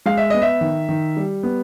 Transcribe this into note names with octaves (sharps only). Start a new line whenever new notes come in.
G#3 F5
E5
B3 D#5
E5
D#3
D#3
G3
B3